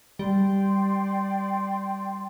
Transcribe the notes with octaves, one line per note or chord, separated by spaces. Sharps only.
G3 D5 G5 C6